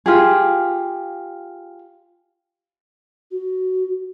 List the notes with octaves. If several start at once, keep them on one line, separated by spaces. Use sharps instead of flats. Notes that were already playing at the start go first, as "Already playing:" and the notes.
F4 G4 G#4
F#4